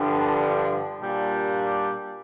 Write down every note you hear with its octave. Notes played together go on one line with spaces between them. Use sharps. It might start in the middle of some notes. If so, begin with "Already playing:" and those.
Already playing: G2 D3 F3
A#2 G3 D4